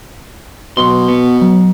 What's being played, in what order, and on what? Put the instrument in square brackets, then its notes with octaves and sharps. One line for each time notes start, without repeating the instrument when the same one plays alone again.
[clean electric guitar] B1 C6 [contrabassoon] B2
[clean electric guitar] B3
F#3